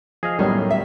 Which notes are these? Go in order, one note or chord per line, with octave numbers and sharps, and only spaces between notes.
F3 G#4 D#5 F5
F#2 A2 D#3 F#3 G3 B3 C#4
E5